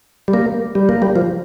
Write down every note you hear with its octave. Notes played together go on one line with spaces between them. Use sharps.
G3
A#3
G3
A#3
G3
F3